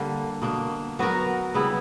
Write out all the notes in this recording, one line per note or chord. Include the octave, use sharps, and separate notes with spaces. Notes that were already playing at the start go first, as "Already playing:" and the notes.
Already playing: D3 G3 A#3
B2 A#3 D4
F#3 B3 F#4 A#4
C#3 G3 B3 E4